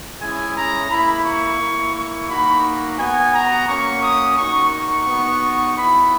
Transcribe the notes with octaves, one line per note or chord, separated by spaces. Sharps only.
G#3 C#4 E4 G#5
A#5
A#3 E4 B5
C#6
A#3 E4
C#6
A#3 D#4 F#4 B5
B3 F#4 G#5
A#5
A#3 C#4 F#4 C#6
D#6
A#3 D#4 F#4 C#6
C#6
B3 D#4 F#4
B3 E4 B5